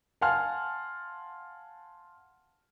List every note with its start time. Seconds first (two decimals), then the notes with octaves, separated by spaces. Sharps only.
0.21 F5 F#5 G#5 A5 C6 F6